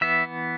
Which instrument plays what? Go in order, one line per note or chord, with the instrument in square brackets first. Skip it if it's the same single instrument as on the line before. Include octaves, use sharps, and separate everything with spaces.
[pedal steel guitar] E3 B3 E5